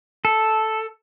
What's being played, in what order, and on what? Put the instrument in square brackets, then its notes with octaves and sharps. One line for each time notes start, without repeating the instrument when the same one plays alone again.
[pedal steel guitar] A4